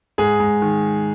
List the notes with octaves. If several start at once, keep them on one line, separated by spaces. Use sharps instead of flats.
G#2 G#4
G#2
D#3